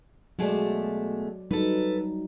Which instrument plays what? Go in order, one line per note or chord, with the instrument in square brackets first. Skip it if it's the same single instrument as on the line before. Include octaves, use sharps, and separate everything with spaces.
[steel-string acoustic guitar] B2 G#3 A3 [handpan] F#3 D5
[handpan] F#3 G3 D#4 [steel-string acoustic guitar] A4 B4